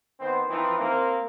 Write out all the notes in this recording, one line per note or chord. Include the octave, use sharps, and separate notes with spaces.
D#3 B3 C4 C5
E3 F3 C4 D#4 E4
A#3 C4